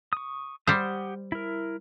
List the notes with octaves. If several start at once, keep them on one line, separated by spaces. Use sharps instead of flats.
C#6 D#6
G3 G4 C5 F#5 D#6
E4 A#4